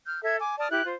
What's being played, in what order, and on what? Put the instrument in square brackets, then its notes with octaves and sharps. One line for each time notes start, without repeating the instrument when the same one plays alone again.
[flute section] F6 G6
A4 E5 G#6
G#5 D6
D5 A5 D#6 F6
E4 G4 F#6 G6
F4 C5